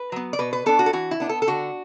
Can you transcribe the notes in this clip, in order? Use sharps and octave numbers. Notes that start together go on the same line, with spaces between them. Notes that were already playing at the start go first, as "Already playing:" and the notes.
Already playing: B4
F#3 B3
D5
B2 B4
B4
B3 D4 A4
F#4
A4
E3 F#4
E4
B3 D4
A4
A4
D3 F#4